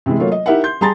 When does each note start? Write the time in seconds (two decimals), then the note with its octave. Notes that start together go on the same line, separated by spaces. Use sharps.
0.06 C3 E3 G#3
0.20 F#3 A3 A#3 F4 C#5
0.32 D#5
0.46 D#4 E4 G4 A#4 E5 F#5
0.64 C6 G6
0.81 G3 G#4 A5 A#5 C6 A6